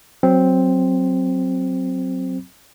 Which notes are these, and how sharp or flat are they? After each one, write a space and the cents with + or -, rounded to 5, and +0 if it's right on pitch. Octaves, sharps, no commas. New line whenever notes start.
F#3 +0 C4 +0